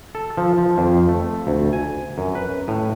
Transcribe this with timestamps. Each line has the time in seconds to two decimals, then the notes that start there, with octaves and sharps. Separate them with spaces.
0.15 A4
0.38 F3
0.58 F3
0.78 F2
1.09 A3
1.47 D2
1.73 G#5
2.18 F#2
2.35 B4
2.68 A2